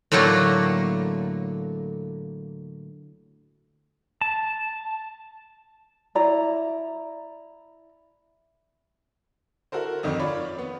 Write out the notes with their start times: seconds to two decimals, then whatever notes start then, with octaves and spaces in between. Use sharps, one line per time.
0.12 A2 D3 F#3 A3 A#3
4.21 A5
6.15 E4 D5 A#5
9.72 E4 F#4 A4 A#4 C5
10.03 G#1 F2 D#3
10.19 F4 C#5 D5 B5
10.58 B3